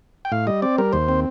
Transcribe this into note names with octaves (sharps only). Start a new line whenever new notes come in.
G5
A2 F5
G3 D#5
C4 D5
G3 A#4
D#2 C5
C4